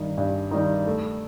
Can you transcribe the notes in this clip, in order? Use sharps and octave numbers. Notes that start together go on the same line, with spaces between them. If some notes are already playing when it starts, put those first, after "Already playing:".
Already playing: G2 D#3 G3
G2
D#3 G3
A3